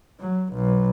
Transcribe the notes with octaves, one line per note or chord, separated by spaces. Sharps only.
F#3
B1